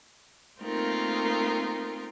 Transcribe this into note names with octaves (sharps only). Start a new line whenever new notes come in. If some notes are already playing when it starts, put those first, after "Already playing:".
A3 A#3 C4 D#4 F4 A#4